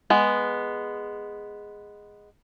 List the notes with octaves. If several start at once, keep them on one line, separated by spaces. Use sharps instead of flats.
G#3 B3